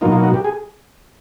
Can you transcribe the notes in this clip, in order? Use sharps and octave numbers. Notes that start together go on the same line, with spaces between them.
B2 F#3 A#3 D#4 F4
F4
F#4
G4
G#4